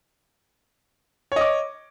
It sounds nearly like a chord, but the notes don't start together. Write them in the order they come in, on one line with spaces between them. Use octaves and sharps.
C#5 D#5 D6